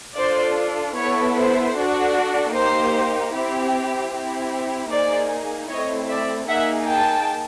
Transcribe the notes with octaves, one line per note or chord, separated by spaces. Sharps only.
D4 F4 A4 C5 D5
B3 E4 A4 C#5
C5
D4 F#4 A4
A#3 D#4 G4 C5
C4 E4 G4
C4 E4 G4
A#3 D#4 G#4 C5 D5
A3 C4 E4 C#5 D#5
D5 E5
A#3 D#4 G#4 E5 F#5
G5 A5